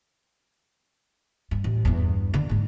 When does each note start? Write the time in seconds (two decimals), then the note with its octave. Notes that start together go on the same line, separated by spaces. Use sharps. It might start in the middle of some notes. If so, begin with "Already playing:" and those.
1.51 G2
1.64 A1
1.85 E2 G2
2.34 D3
2.49 G#2 G#3